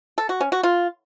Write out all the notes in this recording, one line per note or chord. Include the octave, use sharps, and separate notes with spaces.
A4
F#4
C#4
F#4
F4